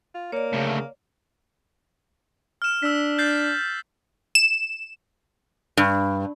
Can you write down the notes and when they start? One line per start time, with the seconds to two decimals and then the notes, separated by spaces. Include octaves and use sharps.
0.14 F4
0.32 A#3 C#5 D5
0.53 D2 A2 C#3
2.62 F6 E7
2.83 D4 E6 B6
3.19 G6 A6 C7
4.35 E7
5.77 G2